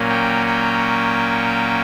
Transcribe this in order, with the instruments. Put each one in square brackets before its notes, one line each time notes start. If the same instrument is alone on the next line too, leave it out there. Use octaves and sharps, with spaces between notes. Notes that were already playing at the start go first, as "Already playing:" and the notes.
Already playing: [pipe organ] A#2 F#3 A#3 C#4
G5
G5